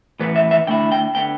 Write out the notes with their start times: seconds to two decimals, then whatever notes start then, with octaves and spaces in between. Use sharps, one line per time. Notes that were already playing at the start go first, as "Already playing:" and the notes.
0.20 A2 E3 B3 B4
0.36 E5
0.51 E5
0.67 D3 A3 E4 G5
0.92 G5
1.15 D3 B3 G5